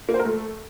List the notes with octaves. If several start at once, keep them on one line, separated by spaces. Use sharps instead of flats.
A#3
C5
A#4
A3